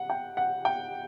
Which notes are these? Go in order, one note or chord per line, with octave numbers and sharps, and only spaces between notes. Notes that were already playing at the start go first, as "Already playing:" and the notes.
Already playing: F#5
G5
F#5
G5